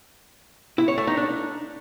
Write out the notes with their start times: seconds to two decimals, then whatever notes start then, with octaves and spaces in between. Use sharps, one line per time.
0.78 E4
0.88 C#5
0.98 A3
1.07 D#4
1.17 D4